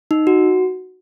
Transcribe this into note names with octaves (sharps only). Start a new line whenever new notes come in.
D#4
F#4